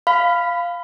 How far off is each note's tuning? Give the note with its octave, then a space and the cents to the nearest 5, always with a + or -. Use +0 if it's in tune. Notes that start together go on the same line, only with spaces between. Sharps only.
F5 -5 B5 +20